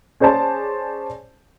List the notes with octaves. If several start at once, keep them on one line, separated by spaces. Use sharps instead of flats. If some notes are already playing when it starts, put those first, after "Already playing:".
C#4 G#4 C5 D5 A5